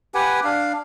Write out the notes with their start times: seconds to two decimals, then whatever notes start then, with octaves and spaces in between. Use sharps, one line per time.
0.14 G4 B4 F#5 G#5
0.44 D4 F5